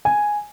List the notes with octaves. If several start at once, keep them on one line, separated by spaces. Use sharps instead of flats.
G#5